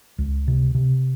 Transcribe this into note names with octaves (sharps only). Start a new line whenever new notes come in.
C#2
C3
C3